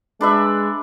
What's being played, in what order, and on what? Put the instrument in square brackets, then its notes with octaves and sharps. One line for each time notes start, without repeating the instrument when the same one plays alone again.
[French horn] G#3 [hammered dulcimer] D4 B4 E5